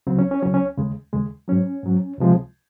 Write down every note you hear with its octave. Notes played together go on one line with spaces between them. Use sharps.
C#2 C#3 F#3 C4
C#4
C#4
C#2 C#3 F#3 C#4
C#4
D#2 C#3 G#3
D#2 C#3 G#3
G#2 F#3 C#4
G#2 F#3
C#2 C3 F3 G#3